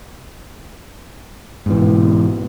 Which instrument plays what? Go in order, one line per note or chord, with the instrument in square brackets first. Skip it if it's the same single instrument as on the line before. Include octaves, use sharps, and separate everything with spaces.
[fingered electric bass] G#2 B2 E3